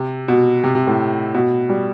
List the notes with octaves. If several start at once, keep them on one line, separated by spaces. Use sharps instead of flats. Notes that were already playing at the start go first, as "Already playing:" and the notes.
Already playing: C3
B2
C3
C3
A2
B2
G3